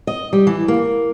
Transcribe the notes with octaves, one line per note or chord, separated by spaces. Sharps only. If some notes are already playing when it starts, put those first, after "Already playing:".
D#5
G3
E3
A#3